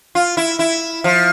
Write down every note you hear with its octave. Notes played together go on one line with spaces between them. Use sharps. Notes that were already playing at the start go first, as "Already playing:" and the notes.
F4
E4
E4
F3